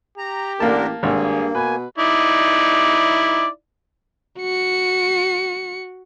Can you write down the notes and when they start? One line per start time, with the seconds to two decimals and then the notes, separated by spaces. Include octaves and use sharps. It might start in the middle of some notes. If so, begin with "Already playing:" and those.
0.18 G4 A#5
0.60 A1 D3 A#3 D4 A#4 A5
1.03 G#1 G2 A#3 G#4
1.55 B2 B4 G#5
1.98 D#4 E4 D5
4.40 F#4 C#7